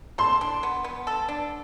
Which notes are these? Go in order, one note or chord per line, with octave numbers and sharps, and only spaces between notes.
A4 C6
D4
B3
B3
A4
D4